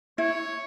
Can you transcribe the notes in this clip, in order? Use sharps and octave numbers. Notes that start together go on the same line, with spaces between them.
E4 C#5